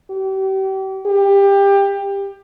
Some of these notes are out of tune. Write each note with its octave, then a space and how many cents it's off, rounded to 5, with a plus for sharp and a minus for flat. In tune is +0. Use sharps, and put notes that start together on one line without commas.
G4 -35
G4 +20